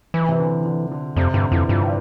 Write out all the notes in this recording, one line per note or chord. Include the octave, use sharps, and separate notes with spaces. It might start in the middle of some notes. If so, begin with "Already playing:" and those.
E3
C3
D3
D3
D3
F2 C3
G2 D3
F2 E3
G2 F3
C4